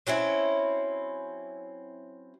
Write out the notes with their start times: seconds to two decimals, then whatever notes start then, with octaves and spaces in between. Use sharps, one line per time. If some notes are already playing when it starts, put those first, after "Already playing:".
0.07 F#3 C4 C#4 E4